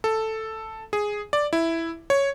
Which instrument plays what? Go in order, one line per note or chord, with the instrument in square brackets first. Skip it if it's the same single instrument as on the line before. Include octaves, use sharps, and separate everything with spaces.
[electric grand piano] A4
G#4
D5
E4
C#5